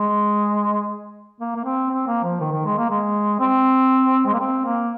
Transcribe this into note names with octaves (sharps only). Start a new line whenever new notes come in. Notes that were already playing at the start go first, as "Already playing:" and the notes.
Already playing: G#3
A#3
A#3
C4
C4
A#3
F3
D#3
D#3
G#3
A#3
G#3
C4
G#3
A#3
C4
A#3